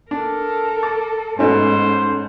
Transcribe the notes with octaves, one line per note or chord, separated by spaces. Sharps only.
D4 A4 A#4
D6 A6
G#2 B2 A3 C#4 D#4 A4 C5